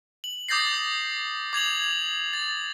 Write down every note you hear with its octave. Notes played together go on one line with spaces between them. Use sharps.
F#7
D6 D#6 G6 A6 A#6 C7
D6 G#6 F7 F#7
A6